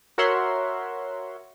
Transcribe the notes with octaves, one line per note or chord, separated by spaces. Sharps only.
F#4 A#4 C#5 E5 F#5 C6